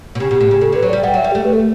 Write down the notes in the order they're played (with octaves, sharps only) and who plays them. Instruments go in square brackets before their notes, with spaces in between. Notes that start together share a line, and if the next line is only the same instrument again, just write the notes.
[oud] B2
[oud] C#3 [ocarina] G4
[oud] B2
A2
C#3
[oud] C#3 [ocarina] A4
[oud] D3 [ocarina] B4
[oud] F#3
[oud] G3 [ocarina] D5
[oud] G3 [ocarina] F#5
[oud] F#3 [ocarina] E5
[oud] G3
[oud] A3 [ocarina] G4
[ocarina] B4
A4